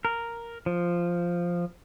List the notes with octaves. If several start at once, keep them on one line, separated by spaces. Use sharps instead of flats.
A#4
F3